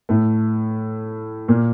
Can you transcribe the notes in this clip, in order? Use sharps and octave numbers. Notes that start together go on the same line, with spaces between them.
A2 A3
A#2 A#3